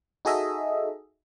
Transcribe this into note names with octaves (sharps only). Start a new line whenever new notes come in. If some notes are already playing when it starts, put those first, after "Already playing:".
D#4 F#4 G#4 A4 D#5 E5